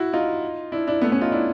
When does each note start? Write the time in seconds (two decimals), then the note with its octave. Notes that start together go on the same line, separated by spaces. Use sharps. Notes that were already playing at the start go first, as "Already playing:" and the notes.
Already playing: E4 F#4
0.13 D#4 F4
0.72 D4 E4
0.87 D4 E4
1.01 A3 B3
1.12 B3 C#4
1.21 D#4 F4
1.32 D4 E4